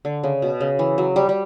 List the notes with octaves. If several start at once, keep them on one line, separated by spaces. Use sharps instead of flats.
D3
C#3
B2
C#3
E3
F#3
G3
G3